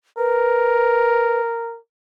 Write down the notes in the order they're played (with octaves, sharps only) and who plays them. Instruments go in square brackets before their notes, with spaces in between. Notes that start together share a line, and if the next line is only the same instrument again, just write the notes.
[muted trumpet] A#4 [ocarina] B4